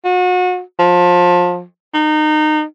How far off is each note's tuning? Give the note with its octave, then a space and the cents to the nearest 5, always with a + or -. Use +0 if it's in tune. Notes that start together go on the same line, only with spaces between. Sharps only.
F#4 -35
F3 +25
D#4 -25